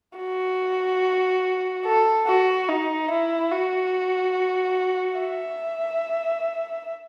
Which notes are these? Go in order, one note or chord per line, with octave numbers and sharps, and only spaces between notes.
F#4
A4
F#4
D#4
E4
F#4
E5